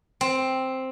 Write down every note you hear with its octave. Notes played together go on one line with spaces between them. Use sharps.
C4